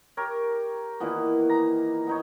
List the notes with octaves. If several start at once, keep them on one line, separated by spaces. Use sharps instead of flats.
G4 A#4 C#5
A#2 D#3 E3 B3
A#5
B3 D#4 C#5